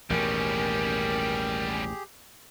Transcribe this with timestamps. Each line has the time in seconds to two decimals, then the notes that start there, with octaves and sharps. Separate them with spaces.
0.10 A1 D#2 B2 G3 C#4 G4 G#4 A#4